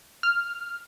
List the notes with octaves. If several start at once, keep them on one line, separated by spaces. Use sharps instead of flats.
F6